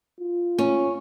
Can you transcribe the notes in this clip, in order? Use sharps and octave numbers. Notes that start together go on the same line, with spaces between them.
F4
C#4